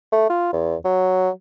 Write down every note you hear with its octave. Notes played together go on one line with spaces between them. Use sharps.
A3
F4
E2
F#3